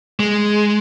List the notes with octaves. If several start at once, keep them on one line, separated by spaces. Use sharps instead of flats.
G#3